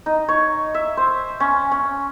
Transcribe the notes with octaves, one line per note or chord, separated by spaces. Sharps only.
D#4
C#5
E5
C5
C#4
C#4